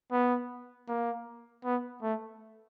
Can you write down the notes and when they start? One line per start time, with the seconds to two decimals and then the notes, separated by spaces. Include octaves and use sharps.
0.12 B3
0.88 A#3
1.65 B3
2.02 A3